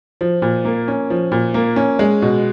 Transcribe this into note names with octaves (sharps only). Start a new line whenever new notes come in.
F3
A#2
A#3
C#4
F3
A#2
A#3
C#4
G#3
B2